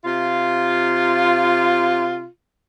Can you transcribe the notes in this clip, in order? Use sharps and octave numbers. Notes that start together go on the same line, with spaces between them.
C3 F4